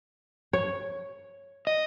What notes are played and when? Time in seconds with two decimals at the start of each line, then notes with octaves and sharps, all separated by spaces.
0.53 C#5
1.67 D#5